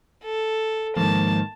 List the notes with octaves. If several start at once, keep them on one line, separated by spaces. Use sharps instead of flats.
A4
G#2 D#3 F3 A#3 A5